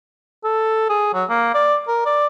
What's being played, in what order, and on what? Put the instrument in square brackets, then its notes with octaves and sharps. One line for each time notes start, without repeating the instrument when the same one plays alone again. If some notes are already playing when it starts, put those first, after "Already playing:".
[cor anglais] A4
G#4
F#3
A#3
D5
A#4
D5